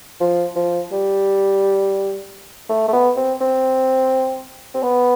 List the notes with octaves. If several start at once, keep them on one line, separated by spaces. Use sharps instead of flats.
F3
F3
G3
A3
A3
B3
C4
C4
C4
B3